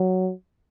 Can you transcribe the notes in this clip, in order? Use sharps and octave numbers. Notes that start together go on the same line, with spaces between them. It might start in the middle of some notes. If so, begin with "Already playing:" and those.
Already playing: F#3